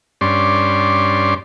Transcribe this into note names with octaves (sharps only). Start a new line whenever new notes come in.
G2 C#4 D5 C6